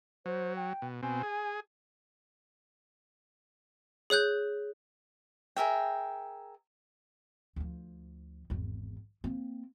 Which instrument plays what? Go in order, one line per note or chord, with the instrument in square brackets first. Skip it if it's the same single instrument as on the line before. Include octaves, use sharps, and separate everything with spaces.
[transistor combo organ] F#3 [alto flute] C5
[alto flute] G5
[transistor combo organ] B2
[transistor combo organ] B2 C4 [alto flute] G#5
[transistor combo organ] G#4
[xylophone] G#4 C#5 F#6 G6
[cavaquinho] G#4 A#4 E5 G5
[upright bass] D2 F3
G#1 E2
A#3 C4